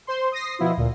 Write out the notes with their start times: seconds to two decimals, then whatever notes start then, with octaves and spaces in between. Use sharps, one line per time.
0.07 C5 C6
0.32 D#6 A#6 C7
0.59 B2 F3 B3 E4 F4
0.77 D2 A#2